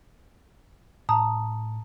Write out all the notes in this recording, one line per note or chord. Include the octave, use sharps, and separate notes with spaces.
A2 A5 A#5 D#6